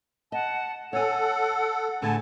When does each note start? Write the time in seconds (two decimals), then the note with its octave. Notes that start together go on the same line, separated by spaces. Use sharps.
0.32 D#5 F#5 A5
0.93 A4 C#5 F#5 G#5
2.02 A2 D3 G#4 G#5 A5